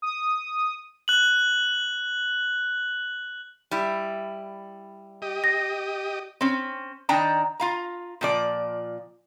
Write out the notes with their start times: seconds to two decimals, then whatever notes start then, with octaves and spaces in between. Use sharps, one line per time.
0.02 D#6
1.08 F#6 F#7
3.71 G3 E4
5.22 G4 D#5
5.44 A#6
6.41 C4 C#4
7.09 D#3 D4 D#4 G5 A5 A#5
7.60 F4 F5 A#5
8.21 A#2 F3 D5